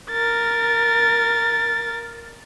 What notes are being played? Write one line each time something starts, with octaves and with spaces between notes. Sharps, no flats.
A#4 A6